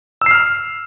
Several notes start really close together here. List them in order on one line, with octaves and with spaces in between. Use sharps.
E6 C7 F6